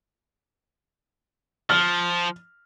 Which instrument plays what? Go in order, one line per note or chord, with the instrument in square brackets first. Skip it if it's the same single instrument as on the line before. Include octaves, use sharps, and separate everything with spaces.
[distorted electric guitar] F3 [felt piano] F6